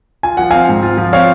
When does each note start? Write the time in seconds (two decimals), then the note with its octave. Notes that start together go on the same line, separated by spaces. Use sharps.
0.23 F4 G#5
0.37 F3 F#5
0.51 C4 F5 G#5
0.69 G#2
0.83 F4
0.97 F3
1.13 C4 C#5 F5